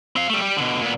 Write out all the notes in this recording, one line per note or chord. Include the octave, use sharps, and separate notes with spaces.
C4 F5
G3 A3
G3
B2 D3
A#2 B3